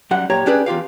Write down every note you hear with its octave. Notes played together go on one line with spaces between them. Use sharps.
F#2 G3 F#5
A#2 G4 C#5 A#5
C#4 D4 G4 G#4 B4 D5
E2 F4 G4 F5